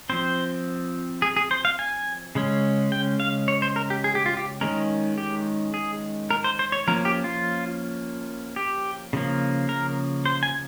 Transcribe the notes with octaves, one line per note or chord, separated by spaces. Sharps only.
F3 C4 C5
G#4
G#4
C5
F5
G#5
C#3 G#3 C#4
G5
F5
C#5
C5
A#4
G4
G#4
G4
F4
G4
D#3 G#3 C#4 A#4
G4
G#4
A#4
C5
C5
C#5
F3 A#3 C#4 A#4
G4
F4
G4
C#3 F3 A#3
A#4
C5
G#5